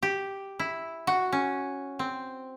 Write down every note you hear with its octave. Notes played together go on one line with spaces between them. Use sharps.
G4
E4
F#4
C#4
C4